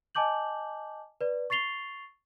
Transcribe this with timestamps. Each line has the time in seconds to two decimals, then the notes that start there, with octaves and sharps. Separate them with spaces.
0.15 D#5 G#5 A5 D6 G6 F#7
1.21 B4 D5
1.50 C#6 A6 C7 F7 G7